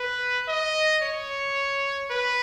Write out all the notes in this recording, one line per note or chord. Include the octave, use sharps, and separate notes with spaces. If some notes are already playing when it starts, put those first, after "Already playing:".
Already playing: B4
D#5
C#5
B4